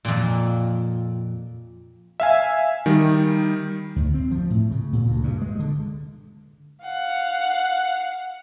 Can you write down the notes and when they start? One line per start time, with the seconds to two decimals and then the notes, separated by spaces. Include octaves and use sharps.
0.05 F2 A#2
2.20 E5 F5 G#5
2.86 D#3 G3
3.96 D2
4.14 C4
4.31 F3
4.50 A2
4.71 C#3
4.93 A#2
5.07 D2
5.23 G2
5.42 G#3
5.60 D3
6.84 F5 F#5